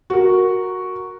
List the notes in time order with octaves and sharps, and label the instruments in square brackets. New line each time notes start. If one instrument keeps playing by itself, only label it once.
[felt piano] F#4 A#4